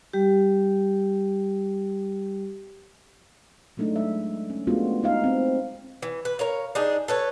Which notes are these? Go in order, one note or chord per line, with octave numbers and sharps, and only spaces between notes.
G3 G4
F#3 G#3 A3 D4 D#4
G#3 E5
C#4
G#3 A3 B3 D4 F4 F#4
B3 D#4 F5
C4
E3
B4
A#4 C#5 F5
D4 D#4 G#4
A4 B4 C#5